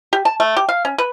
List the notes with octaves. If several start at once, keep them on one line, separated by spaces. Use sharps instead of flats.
G4
A5
A3
G4
F5
C#4
B4